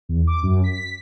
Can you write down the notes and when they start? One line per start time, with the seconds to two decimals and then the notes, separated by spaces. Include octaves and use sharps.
0.09 E2
0.27 D6
0.43 F#2
0.64 B6